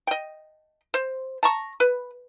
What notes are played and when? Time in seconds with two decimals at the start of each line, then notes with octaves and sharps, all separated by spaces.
0.07 D#5 G5
0.94 C5
1.43 A5 A#5 C#6
1.80 B4